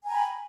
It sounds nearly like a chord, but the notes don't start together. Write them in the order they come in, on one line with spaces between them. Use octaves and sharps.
G#5 A#5 G5 B5